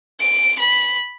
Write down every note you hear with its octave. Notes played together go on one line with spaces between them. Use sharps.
D7
B5